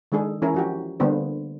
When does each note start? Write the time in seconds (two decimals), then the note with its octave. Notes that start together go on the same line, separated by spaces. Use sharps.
0.12 D#3 G#3 D4 G#4 A4
0.42 E3 C#4 E4 A#4
0.54 F3 F#4 G4
1.00 D3 G3 A#3 B3 D4 C5